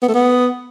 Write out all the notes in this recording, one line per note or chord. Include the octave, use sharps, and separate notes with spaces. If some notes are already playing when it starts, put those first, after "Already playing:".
B3
A3
B3